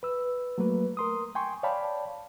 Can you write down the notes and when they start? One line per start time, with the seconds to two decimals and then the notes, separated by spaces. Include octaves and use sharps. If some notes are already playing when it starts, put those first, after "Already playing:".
0.03 B4 E6
0.58 F#3 A3 A#3 B4
0.97 A#4 C6 D#6
1.35 G5 G#5 C6 C#6
1.63 C#5 D5 F5 G5 A5 B5